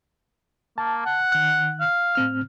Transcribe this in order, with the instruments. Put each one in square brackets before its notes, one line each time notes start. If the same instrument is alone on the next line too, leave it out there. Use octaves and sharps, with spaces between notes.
[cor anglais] A#3 [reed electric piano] A5
[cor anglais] F#5
[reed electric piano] D#3 F#6
[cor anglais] F5
[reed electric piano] A2 C4 F6